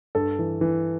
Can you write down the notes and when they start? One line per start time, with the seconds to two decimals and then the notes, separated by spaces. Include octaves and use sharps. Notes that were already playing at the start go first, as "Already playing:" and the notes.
0.15 G2 A4
0.39 E3
0.61 E3